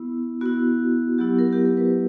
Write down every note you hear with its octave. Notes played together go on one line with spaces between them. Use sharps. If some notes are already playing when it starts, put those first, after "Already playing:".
Already playing: B3 E4
B3 E4 F#4
F#3 B3 E4 G4
A#4
G4
A#4
B4